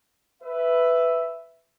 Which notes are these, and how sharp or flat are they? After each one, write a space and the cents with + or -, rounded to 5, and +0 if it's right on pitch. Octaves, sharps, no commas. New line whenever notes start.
B4 +10 E5 +0